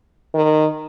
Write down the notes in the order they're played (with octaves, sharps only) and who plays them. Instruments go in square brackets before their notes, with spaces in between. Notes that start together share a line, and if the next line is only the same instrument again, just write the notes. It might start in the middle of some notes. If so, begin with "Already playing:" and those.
[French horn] D#3